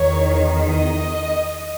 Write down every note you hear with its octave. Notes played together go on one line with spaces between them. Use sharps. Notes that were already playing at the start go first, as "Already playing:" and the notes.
Already playing: E2 D#3 C#5
D#5